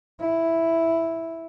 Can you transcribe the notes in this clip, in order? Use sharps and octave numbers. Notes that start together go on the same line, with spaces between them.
E4